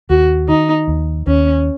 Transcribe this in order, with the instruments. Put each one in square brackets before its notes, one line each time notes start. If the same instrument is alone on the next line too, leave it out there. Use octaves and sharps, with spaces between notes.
[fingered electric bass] D#2 [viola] F#4
[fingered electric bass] D#3 [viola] D#4
[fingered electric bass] D#2
[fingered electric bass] D#2 [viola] C#4